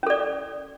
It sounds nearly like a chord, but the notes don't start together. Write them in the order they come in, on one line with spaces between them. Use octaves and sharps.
C#4 A4 D5